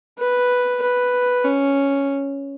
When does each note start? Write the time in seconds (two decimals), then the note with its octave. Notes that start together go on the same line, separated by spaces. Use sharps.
0.18 B4
0.82 B4
1.44 C#4